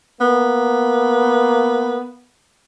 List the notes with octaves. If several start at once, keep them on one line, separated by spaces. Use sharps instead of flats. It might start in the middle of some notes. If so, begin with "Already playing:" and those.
A#3 B3